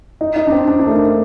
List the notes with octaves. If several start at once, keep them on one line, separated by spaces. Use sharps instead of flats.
D#4
D#4
D4
C4
D4
D4
A3
A#3